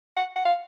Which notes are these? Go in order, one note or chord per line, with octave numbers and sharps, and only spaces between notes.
F#5
F#5
F5